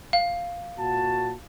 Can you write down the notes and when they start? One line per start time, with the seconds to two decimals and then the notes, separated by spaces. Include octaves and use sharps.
0.13 F5
0.78 A#2 F#4 A5